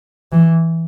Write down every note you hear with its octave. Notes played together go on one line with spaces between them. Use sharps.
E3